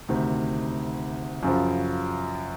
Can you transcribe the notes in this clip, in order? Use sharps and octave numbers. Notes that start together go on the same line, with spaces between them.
D2 C3 D#3
F#2 C#3 F3